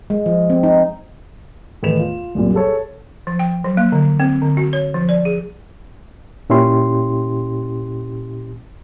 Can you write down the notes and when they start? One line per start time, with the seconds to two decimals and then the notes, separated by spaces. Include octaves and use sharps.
0.10 G#3
0.26 F3
0.50 C4
0.63 D#4
1.83 E2 A2 D#3 B4 E7 F7
1.99 F4
2.35 C2 F#2 A#2
2.54 G#4 A4 C#5
3.27 F3
3.39 G5
3.64 F#3
3.77 A#3
3.92 D3
4.20 C4
4.42 D3
4.57 F#4
4.73 C#5
4.94 F3
5.09 D5
5.25 G#4
6.50 A#2 C#4 E4 G4 C6